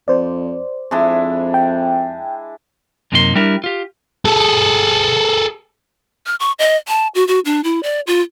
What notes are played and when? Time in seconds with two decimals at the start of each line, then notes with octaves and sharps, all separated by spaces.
0.08 F2 C5 D5
0.91 F2 G#3 D4 E4
1.54 G5
3.12 F#2 C3 A#3 D#4 G#4 C6
3.35 G3 D4 E4 G4 A#4
3.64 F4 G4
4.25 G#4 A4
6.27 F6
6.40 C#6
6.59 D#5
6.88 A5
7.15 F#4
7.28 F#4
7.45 D4
7.64 E4
7.83 D5
8.07 F4